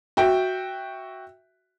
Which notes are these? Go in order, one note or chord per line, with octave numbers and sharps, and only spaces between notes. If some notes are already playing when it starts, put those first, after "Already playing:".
F#4 E5 G5